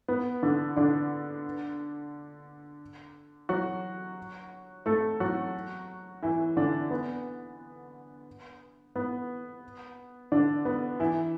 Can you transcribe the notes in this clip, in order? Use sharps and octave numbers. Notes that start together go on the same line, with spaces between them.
B3
D3 D4
D3 D4
F#3 F#4
A3 A4
F#3 F#4
E3 E4
D3 D4
B3
B3
D3 D4
B3
E3 E4